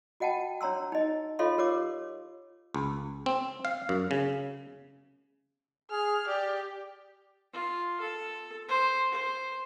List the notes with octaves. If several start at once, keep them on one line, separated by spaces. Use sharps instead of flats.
F#4 D#5 F#5 G5 A5
D4 C#5 A#5 C6 E6
D#4 D#5
F4 A4 C#5 D#5 F5 C6
G4 A#4 C#5 D6
C#2
C4
F5
F#2
C#3
G#4 F6
G4 D5
F4
A4
C5
C5